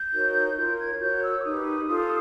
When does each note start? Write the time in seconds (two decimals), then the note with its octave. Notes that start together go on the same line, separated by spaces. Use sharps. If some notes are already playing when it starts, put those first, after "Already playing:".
Already playing: G6
0.13 D#4 F#4 A#4 C#5
0.56 F4 A#4 C#5 G6
0.78 G#6
0.99 F#4 A#4 C#5 G6
1.22 E6
1.39 D6
1.43 D#4 G4 B4 D#6
1.87 F4 A4 C5